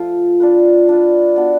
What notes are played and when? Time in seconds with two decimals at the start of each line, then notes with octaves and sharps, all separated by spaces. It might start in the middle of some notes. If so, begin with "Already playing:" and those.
Already playing: F3 A3 F4
0.40 D4 F4 B4
0.89 D4 F4 B4
1.36 B3 D4 F#4